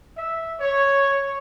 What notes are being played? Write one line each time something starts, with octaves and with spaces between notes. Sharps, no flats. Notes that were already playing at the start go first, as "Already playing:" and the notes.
E5
C#5